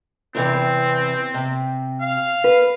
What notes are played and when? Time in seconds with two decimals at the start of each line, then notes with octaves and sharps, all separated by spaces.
0.35 E2 C3 E3 C4
1.34 C3
2.01 F5
2.44 B4